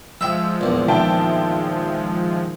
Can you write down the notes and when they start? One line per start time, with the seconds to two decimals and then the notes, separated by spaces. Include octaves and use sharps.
0.21 F3 G#3 E5 G5 E6
0.61 A#1 E2
0.88 D#3 E5 G5 A5